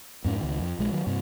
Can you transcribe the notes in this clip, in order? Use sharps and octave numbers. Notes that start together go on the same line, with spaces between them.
F2 G#2 C#4
C#2 D#3
F2
A#1 G#3
D#3 F#3
G2 C3